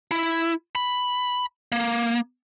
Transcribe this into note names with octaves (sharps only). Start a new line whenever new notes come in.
E4
B5
A#3